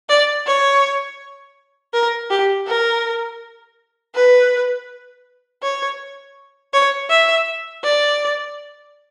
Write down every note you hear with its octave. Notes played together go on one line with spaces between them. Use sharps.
D5
C#5
A#4
G4
A#4
B4
C#5
C#5
E5
D5